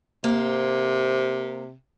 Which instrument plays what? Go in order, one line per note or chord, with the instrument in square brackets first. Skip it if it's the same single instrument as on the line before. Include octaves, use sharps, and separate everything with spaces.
[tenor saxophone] C3 [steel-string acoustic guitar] A#3 C5